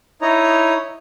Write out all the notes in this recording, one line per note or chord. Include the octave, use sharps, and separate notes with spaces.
D#4 E4 C#5 D#5 A#5